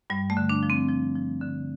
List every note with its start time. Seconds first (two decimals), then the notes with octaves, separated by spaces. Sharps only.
0.10 G2 G3
0.30 A3
0.37 D3
0.49 D4
0.63 F3
0.70 C4
0.89 F3
1.15 F3
1.42 D3